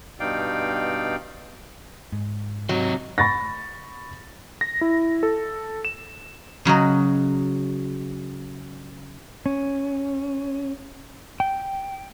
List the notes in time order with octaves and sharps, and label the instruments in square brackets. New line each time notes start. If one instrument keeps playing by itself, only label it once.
[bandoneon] G2 B2 D#4 D5 F5 G5
[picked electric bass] G#2
[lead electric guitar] C3 D#4 [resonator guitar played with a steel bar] F#3
[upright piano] B5 C#6 A6 A#6
[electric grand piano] A#6
E4
A4
E7
[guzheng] C#3 F#3 F#4 D#5
[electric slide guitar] C#4
G5